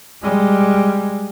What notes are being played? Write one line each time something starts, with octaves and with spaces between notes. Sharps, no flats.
G3 G#3